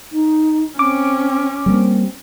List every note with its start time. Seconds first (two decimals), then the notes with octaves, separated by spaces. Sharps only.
0.12 D#4
0.79 C4 C#4 D6
1.66 G3 G#3 A#3 C4